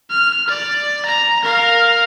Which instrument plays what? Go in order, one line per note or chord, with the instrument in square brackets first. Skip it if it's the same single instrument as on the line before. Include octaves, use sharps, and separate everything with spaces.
[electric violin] F6
D5
A#5
A#4 F5